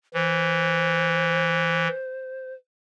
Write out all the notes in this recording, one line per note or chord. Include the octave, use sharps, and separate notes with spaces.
E3 C5